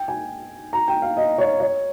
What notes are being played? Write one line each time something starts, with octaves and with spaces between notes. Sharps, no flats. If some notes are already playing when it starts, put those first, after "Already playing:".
Already playing: G5
G#5
A#5
G5
F5
D#5
C#5
C#5